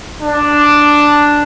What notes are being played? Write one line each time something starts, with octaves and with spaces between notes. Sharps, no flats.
D4